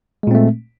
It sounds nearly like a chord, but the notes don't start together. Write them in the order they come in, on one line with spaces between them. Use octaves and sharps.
G#3 A#2 C4 A3